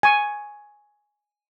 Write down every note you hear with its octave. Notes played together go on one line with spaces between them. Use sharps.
G#5 C#6